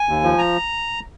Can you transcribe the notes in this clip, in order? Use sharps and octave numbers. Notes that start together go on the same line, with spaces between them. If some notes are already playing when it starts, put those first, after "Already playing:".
Already playing: G#5
D#2
F3
A#5